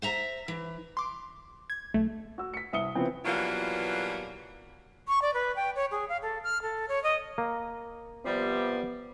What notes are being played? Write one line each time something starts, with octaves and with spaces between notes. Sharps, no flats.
C5 E5 A#5
E3
C6 D6
G#6
B1 A3
F#4 E6
B6 C#7
C2 E5 D#6 C#7 G7
C#3 F3 B3 C4 E4
B2 E3 F#3 G3 A#3 F4
C#6
D5
B4
G5
C#5
G#4
F5
A4
F6
A4
C#5
D#5
A#3
C3 F3 G3 B3